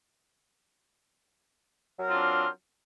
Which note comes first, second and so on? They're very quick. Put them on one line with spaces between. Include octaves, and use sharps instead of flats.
F#3 A#4 C4 F4 D4